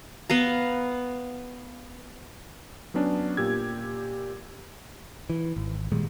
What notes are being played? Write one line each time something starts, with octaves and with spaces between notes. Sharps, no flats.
B3 F5 A#5
F#3 B3 C#4 D4
A#2 G4 E6 G#6
E3
G#1
A#2 D#3 G3 G#3